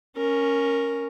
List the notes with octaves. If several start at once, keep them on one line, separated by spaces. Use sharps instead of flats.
C#4 A#4